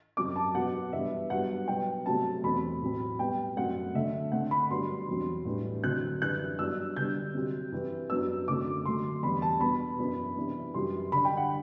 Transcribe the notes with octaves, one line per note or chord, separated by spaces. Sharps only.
F#2 F#3 C4 D6
A5
B2 F#3 B3 F#5
G2 E3 B3 D4 E5
G2 F#3 B3 F#5
B2 F#3 B3 G5
C3 F#3 A3 C4 A5
E2 B2 A3 C4 B5
A2 F#3 C4
B2 G3 B3 G5
F#2 F#3 A3 C4 F#5
D3 A3 D4 E5
D3 A3 C4 F#5
B5
G2 F#3 B3 D4 C6
E2 B2 F#3 C4
A2 E3 G3 D4
D3 F#3 C4 F#6
F#2 E3 G3 D4 F#6
G2 F#3 B3 D4 E6
D3 G3 B3 D4 G6
C3 F#3 C4
G2 E3 G3 C4
F#2 F#3 B3 D4 E6
F#2 D3 A3 C4 D6
D3 F#3 A3 C6
E2 C3 G3 D4 B5
A5
B2 G3 B3 B5
F#2 E3 B3 D4
C3 E3 B3 D4
F#2 E3 G3 C6
D3 G3 D4 B5
G5
F#5